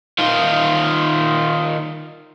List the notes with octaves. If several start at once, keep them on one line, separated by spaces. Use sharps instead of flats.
D#3 F4